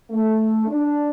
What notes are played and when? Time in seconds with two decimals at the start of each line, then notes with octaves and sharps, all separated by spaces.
0.10 A3
0.66 D4